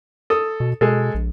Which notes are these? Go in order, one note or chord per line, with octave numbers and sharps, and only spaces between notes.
A4 D#6
B2
B2 G#3 A4
A#1